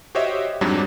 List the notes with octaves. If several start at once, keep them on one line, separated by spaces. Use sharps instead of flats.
F#4 G4 C5 C#5 D#5 E5
F2 G#2 F#3 G3 D4